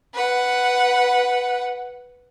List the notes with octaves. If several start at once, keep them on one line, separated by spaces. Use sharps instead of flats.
B4 F#5